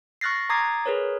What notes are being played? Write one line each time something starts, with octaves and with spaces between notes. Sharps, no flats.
C#6 F6 F#6 A6 A#6 C7
A#5 D6 D#6 G#6 A6 C7
G#4 A#4 B4 C#5